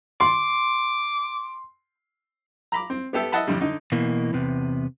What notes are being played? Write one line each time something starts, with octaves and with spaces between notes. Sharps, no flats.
C6 D6
A#5 B5 D6
C4
B3 G4 A4 E5
D#5 E5 F#5 A5 B5
F2 A2 D3 G3
D3 D#4
B2 E3 A#3
E2 C3 B3